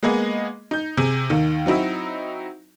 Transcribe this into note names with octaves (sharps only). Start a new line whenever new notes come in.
G#3 A#3 B3 G#4 D#5
D#4 G6
C3 G#4
D#2 D#3
F#3 C4 D#4 E4 F#4